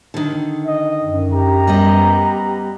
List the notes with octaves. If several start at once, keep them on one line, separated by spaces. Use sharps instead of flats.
D3 D#3
D#5
F#2
G4 A#5
G3 B3 D#5